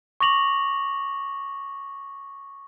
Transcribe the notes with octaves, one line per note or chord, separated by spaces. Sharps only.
C#6 D6 A#6 F7 F#7